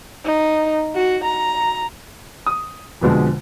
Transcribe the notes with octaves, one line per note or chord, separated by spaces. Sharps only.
D#4
F#4
A#5
D#6
F2 B2 D3 G#3